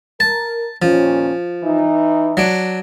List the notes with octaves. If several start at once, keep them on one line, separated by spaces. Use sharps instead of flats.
A#4 A5
D#2 A#2 F3 C#4
E3 D#4
F#3 D4